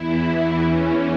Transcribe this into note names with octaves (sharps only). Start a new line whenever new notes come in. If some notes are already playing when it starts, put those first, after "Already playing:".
Already playing: E2 E3 E4
E2 E3 C#4